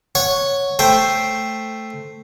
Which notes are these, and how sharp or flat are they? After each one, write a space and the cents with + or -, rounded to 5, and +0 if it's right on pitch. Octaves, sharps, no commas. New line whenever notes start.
C#5 +0 F#5 -10
A3 +0 C5 +0 G5 +0